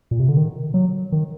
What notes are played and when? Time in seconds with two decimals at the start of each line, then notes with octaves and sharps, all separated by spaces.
0.11 A#2
0.20 C3
0.28 D3
0.36 D#3
0.74 F#3
1.12 D#3